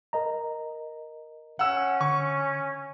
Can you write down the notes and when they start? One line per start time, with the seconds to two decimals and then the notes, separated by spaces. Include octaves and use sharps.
0.13 A#4 D#5 A#5
1.59 C#4 F#5 E6
2.01 D3 C#6